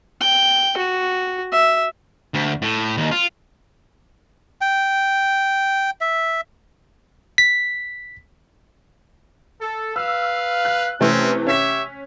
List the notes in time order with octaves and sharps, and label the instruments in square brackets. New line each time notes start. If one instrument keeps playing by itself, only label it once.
[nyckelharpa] G5
F#4
E5
[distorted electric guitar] D2
A2
D#2
F4
[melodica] G5
E5
[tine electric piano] B6
[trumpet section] A4
[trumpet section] B4 F5 [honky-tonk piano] E6
[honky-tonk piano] F#6
[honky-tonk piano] C3 E3 A3 [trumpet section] C4 C#4
[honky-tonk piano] C#4 B6 [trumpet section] G4 C#5 E5